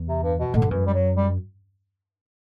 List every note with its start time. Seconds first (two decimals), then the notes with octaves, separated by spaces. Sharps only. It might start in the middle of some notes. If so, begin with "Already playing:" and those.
Already playing: E2
0.09 C3
0.23 G2
0.40 B2
0.54 A2 D3
0.62 G2
0.71 F#2 E3
0.87 G3
0.94 F#3
1.17 G3